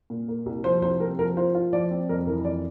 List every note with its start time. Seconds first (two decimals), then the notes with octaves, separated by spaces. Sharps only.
0.10 A#2
0.28 A#3
0.46 C2
0.64 F3 C5
0.82 C2 C5
1.00 C4 A#4
1.19 F3 A#4
1.37 F4 C5
1.55 F4
1.73 F3 D5
1.91 C4
2.09 F2 A#4
2.27 E3 A#4
2.45 F2 D5